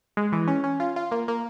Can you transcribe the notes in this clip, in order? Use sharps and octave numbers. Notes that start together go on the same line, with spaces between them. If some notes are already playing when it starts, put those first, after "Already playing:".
G#3
E3
C#4
C#4
F4
F4
A#3
A#3